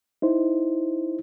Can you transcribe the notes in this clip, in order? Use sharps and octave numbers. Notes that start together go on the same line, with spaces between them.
D#4 E4 C5